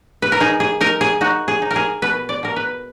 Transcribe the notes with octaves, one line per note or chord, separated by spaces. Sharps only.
B4
A#4
D#4 G#4
G#4
D#4 A#4
G#4
D#4 F#4
G#4
D#4
A#4
G#4
B2 B4
D5
B2 A#4
B4